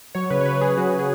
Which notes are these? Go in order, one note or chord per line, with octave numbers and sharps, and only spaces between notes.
F#3 C#5
C#3 B4
C#5
C#3 B4
C#3 G#4
F#3 F#4
C#3
G#4